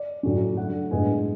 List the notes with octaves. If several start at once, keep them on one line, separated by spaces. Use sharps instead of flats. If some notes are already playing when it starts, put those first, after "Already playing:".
Already playing: D5
A2 F#3 A3 C#4
D3 F#3 A3 F#5
A2 G#3 B3 D4 G#5